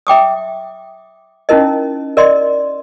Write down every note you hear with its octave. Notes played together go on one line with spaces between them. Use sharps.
E5 G5 D6 D#6
C#4 D#4 E4 A#4 D#5
A#4 D5 D#5 C6